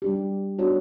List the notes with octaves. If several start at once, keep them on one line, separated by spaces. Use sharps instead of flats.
G3 D4 G4
B3 D4 F#4 C#5